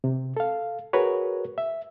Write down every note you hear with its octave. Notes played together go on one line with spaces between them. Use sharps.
C3
A4 F5
F#4 G#4 A#4 B4 C#5
E5